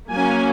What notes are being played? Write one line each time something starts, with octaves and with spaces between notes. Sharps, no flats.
F#3 A#3 C#4 G#5